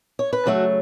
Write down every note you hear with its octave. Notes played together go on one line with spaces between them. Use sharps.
C#5
B4
C#3 F#3 A3 F#4 A4